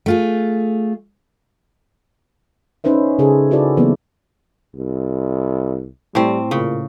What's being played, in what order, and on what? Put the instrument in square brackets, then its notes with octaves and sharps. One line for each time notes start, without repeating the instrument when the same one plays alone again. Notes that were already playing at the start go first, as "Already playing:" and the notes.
[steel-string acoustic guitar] A3 F4 G#4
[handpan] C#4 D#4 B4 C5 E5
C#3 G#4 A4
E4 F#4 A4 B4 D5
E3 F#3 A#3 B3
[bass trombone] C2
[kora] A2 C4 [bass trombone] G3
[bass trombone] A#2 [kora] C#3